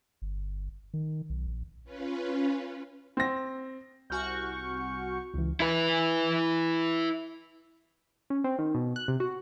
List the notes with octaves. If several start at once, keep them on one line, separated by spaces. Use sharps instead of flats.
G1
D#3
B1
A#1
C#4 F4 B4
C4 A#6
C2 F#4 G#5 C#6 F6 G6
C#2 E3
E4 B4
C#4
C4
D#3
B2
F#6
C3
F#4